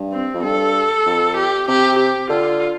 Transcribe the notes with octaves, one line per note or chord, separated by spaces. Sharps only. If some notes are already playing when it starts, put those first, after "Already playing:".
Already playing: G2
C4
F2
G2 A4
F2
G4
C3 G4
G4
D3 F4